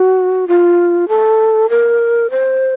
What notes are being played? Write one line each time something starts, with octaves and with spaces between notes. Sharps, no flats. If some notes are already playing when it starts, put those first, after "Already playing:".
Already playing: F#4
F4
A4
A#4
C5